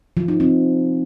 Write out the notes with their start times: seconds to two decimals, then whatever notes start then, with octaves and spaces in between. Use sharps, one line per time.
0.17 F3
0.28 D#4
0.40 C4